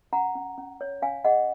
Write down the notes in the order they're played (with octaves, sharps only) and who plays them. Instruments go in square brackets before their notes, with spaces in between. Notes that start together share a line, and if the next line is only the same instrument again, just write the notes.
[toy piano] C#4 F#5 A#5
C#4
C#4
C#5
C#4 F5 G#5
G#4 D#5 F#5